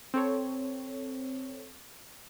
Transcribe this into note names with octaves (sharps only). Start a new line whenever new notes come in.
C4 A4 C#5